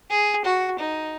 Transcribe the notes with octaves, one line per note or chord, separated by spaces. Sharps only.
G#4
F#4
D#4